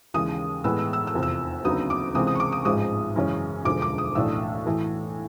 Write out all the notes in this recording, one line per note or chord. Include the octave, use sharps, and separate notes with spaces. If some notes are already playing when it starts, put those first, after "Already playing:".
D#2 C#3 E3 G#3 D#6
A2 E3 G#3 B3 E6
E6
E6
E6
F1 E2 C3 F3
E6
D2 C#3 F#3 B3 D#4 D#6
D6
C#2 C3 E3 G#3 C4 D#6
D#6
C#6
D6
D#6
A1 G#2 F3 G#3 D#6
F#2 C#3 E3 G#3 C#4
E1 D2 D3 F3 G#3 D6
D6
D#6
B1 A2 E3 A3 D4 E6
A2 E3 A3